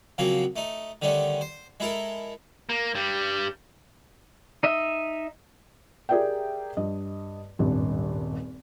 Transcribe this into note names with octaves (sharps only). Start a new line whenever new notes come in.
C#3 F3 F#3 A#3 C4
A3 D#4
D3 D#3 G3 A3 C#4
C5
G#3 E4 A4 A#4
A#3
G2 G3
D#4 D#5 E5
G4 G#4 A#4 D5 E5 G5
G2 D#5
D#1 G#1 G2